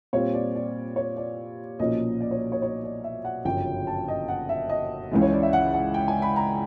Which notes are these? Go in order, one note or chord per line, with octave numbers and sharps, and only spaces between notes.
A#2 G3 C4 F4 C#5
D5
D5
C#5
D5
B1 A#2 F3 A#3 C#4 D#5
D5
C#5
C#5
C#5
D5
E5
F#5
G1 F#2 C#3 F3 G5
A5
D#5
F#5
E5
D#5
C#2 C#3 E3 G#3
C#5
D5
E5
F#5
F#5
G5
G#5
B5
A#5